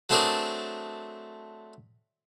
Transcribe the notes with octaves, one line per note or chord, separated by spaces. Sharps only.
F#3 A3 C4 D4 G#4 A#4